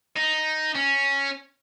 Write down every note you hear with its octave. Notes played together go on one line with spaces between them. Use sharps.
D#4
C#4